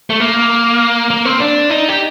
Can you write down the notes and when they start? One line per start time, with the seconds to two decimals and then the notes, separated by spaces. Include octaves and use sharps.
0.10 A3
0.20 A#3
1.10 A#3
1.25 C4
1.40 D4
1.70 D#4
1.89 G4